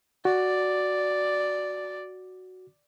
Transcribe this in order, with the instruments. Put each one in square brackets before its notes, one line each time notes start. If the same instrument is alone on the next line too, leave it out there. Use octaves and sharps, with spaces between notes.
[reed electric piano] F#4 [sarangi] D5